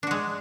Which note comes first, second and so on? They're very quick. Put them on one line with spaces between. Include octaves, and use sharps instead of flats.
D4 F#4 G#3